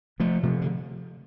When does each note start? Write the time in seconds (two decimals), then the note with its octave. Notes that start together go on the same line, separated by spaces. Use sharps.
0.20 C3 F3 A3
0.43 C3 F3 A3
0.61 D3